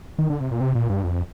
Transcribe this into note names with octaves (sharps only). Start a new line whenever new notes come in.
D#3
D3
C3
A#2
C3
A#2
G2
F2